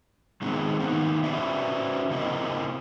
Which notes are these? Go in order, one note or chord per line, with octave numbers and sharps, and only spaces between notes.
D#3 G#3 B3 C4
D#3 A#3 B3 D#4
C#4 F#4 B4 C5 D5 E5
C#3 A#3 C4 E4 D#5